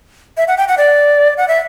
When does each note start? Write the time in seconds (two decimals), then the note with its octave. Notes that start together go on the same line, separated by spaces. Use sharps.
0.37 E5
0.48 F#5
0.57 G5
0.68 F#5
0.78 D5
1.37 F#5
1.48 E5